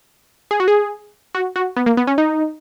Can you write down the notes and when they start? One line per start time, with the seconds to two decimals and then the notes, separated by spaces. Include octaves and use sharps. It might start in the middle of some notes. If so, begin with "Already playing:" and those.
0.51 G#4
0.60 F#4
0.68 G#4
1.35 F#4
1.56 F#4
1.76 B3
1.86 A#3
1.97 B3
2.07 C#4
2.18 D#4